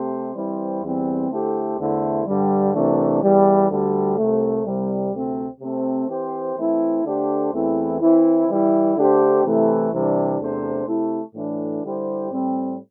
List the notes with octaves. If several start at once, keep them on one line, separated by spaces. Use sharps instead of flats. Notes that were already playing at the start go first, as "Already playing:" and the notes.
Already playing: C3 A3 C4 G4 C5
E3 G3 C4 E4 C5
E2 E3 G3 C4
D3 A3 E4 G4 C5
E2 D3 A3 E4 C5
G2 D3 G3
C2 C3 E3 A3 D4
E2 E3 G3
D2 D3 G3
C2 C3 A3
C2 C3 G3
D2 C3 A3 C4
C3 A3 C4
E3 C4 G4 C5
E3 A3 C4 E4
D3 A3 D4 G4 C5
E2 E3 A3 C4 E4
E3 C4 E4
E3 G3 E4
D3 A3 D4 G4 C5
C3 E3 A3 E4
C2 C3 E3 G3 D4
E2 C3 A3 D4 C5
C3 A3 E4
A2 E3 A3 D4
D3 G3 E4 G4 C5
A2 G3 C4